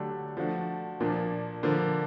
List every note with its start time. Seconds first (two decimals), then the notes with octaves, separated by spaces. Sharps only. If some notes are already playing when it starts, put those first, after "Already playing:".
Already playing: D3 F#3 A3 D4 G4
0.37 F3 A3 D4 F#4
1.00 A#2 F3 A#3 D4
1.63 D3 F3 A#3